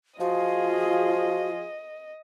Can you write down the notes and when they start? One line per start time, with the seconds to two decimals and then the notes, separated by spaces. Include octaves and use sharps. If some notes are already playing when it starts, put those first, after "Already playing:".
0.20 F3 F4 F#4 G#4 D#5